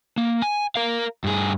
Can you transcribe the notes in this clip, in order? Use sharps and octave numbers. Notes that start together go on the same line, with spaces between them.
A#3
G#5
A#4 F5
G2 G#4